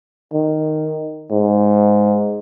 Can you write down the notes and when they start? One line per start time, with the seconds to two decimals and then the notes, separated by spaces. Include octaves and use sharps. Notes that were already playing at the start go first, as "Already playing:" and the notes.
0.33 D#3
1.32 G#2